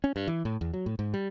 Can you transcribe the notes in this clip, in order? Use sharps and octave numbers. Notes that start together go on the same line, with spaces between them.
C#4
G2
E3
A2
E2
F#3
A2
G#2
G3